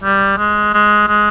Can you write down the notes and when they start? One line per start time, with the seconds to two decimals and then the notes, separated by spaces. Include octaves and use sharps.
0.03 G3
0.38 G#3
0.74 G#3
1.08 G#3